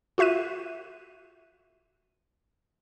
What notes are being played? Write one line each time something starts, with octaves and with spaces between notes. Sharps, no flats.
F4 F#4 E5 F#6 D#7